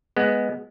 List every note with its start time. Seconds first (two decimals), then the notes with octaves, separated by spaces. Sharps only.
0.16 G#3 B3